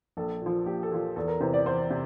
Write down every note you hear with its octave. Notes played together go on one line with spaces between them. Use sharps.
A#1 A4
A#2 F3
A#1 G4
A4
A#2 F3
E2 A4
A#4
C3 E3 C5
D5
E2 C5
C3